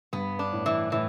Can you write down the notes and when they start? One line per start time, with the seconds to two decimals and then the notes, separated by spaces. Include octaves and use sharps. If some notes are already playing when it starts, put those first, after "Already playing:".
0.13 G2 B3
0.39 D4
0.52 A2
0.66 E3
0.92 A2 E3